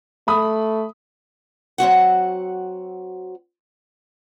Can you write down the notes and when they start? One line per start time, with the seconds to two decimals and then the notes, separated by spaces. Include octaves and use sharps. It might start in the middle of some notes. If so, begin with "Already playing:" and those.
0.28 A3 B5 D#6
1.78 F#3 C4 F#4 F#5